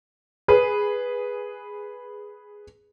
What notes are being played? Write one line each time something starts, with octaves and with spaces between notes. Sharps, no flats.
G#4 B4